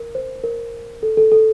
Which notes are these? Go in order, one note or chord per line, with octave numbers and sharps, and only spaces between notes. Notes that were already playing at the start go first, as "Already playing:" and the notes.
Already playing: A#4
C5
A#4
A4
A4
A4